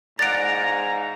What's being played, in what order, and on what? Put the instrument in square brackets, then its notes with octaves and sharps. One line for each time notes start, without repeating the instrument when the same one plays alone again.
[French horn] G#2 [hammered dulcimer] D5 F5 F#5 [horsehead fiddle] A#5 [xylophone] A6 D7